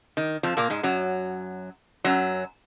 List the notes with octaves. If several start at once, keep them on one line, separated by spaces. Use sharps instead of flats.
D#3
F2 F3
A#2 A#3
G#2 G#3
F#2 F#3
F#2 F#3